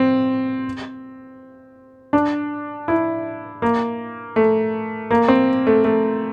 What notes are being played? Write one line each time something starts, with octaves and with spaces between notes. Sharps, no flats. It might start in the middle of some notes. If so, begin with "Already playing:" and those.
Already playing: C4
D4
E4
A#3
A3
A#3
C4
A3
A3